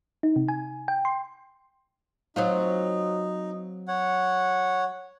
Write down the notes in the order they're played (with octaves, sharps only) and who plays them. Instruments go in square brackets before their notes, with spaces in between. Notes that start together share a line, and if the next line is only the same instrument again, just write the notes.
[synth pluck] D#4
C3
G#5
G5
C6
[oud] F#3 C4 F4 [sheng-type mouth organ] D#4
[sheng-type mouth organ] C#5 F#5